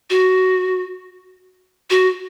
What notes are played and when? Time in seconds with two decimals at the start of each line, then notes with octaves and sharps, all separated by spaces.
0.10 F#4
1.90 F#4